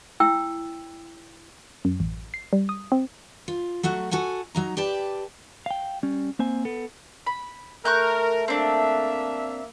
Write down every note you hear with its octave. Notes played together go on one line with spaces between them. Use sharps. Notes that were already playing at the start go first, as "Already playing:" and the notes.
E4 G5 E6
F#2
A1
C7
G3
D#6
C4
F4
F#3 A3 F#4 F#5
F#4 A4 F#5 G#5
F#3 D#4 A#5
G4 B4 D5 G5 A5
F5 G5
G3 C#4
A#3 C4 C5 G#5
B3 A4
B5
A3 A#4 C#6 F#6 G6
A#3 C4 D4 E5